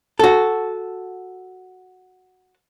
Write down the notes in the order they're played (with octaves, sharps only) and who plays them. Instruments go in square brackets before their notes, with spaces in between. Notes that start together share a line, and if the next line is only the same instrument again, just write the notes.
[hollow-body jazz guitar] F#4 A4